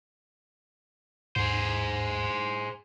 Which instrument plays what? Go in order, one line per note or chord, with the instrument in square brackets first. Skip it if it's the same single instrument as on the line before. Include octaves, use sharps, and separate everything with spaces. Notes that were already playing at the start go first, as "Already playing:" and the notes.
[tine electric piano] D#2 G#2 [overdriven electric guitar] G#4 C5